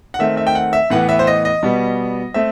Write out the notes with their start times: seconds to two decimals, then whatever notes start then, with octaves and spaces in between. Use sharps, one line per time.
0.14 F#5
0.19 D#3 A3 C4 E5
0.37 E5
0.47 G5
0.55 F#5
0.73 E5
0.90 A2 E3 B3 F#5
1.09 E5
1.19 C5
1.27 D#5
1.45 D#5
1.63 B2 G3 B3
2.34 A3 C4 E5